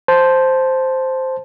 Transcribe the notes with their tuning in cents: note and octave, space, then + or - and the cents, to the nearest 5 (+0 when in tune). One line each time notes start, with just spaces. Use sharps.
C5 +0 A5 -5